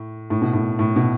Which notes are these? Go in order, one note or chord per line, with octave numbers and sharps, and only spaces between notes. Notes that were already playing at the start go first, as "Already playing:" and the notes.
Already playing: A2
A2
B2
A2
A2
B2